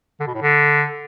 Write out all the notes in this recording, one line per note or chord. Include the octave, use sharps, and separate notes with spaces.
D3
B2
A2
D3